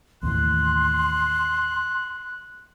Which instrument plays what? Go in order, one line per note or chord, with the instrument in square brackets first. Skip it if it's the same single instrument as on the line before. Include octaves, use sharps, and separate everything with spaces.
[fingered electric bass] D#2 A2 E3 [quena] C6 [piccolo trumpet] F#6